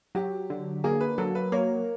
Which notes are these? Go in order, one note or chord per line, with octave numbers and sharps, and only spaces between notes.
F#3 G4
D3
A#3 G#4
B4
F#3 A4
B4
A#3 C#5